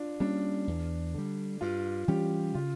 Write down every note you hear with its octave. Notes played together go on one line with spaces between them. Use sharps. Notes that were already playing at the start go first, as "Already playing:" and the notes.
Already playing: D4 F4
G3 A#3 C#4 D4
E2
D3 G3
G2 F4
E3 G3 C#4 G4
C#3 F4